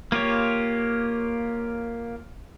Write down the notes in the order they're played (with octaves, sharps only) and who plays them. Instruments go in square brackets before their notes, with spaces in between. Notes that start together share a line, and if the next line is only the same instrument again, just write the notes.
[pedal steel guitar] A#3 F4 G4 C#5